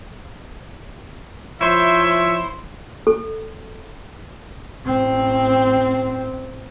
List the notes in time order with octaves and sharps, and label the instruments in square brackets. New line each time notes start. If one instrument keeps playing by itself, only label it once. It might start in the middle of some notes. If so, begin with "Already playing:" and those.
[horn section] F3 C#5 E5 [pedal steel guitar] E4 C5
[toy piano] A4
[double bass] A1 C4